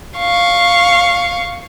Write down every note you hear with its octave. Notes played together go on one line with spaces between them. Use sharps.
F5 C#6